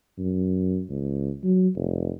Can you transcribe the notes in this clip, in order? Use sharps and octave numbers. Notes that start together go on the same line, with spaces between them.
F#2
C#2
F#3
F1